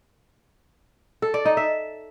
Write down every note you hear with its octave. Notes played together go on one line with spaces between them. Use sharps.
A4
D5
D#4
E5